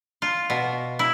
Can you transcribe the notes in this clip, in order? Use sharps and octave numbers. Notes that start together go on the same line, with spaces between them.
F4
B2
E4